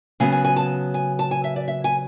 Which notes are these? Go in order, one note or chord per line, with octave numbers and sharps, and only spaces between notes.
C#3 F#3 B3 G#5
G#5
G#5
A5
G#5
A5
G#5
E5
D5
E5
G#5